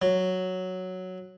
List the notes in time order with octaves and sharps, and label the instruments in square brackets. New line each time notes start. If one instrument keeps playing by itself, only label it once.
[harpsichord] F#3